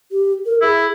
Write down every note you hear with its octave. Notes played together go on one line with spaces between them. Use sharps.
G4
A#4
E4 G#4